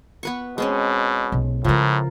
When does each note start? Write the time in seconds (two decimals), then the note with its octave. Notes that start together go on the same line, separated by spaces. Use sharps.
0.23 B3 B4 C#6
0.58 B2 G#3 C4 C#4
1.32 B1
1.64 A2 C#3 F3 G#3 A#4